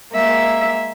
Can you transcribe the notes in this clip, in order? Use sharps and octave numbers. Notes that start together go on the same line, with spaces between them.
G#3 A#3 E5